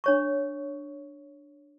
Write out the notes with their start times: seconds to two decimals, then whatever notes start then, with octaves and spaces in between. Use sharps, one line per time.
0.04 D4 C#5 C#6